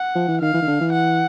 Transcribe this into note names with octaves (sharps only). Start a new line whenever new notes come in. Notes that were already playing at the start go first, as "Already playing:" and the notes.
Already playing: F#5
F3
E3
D#3 F5
E3
D#3
D3
E3
F#5